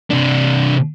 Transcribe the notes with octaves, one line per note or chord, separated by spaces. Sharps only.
C3 D4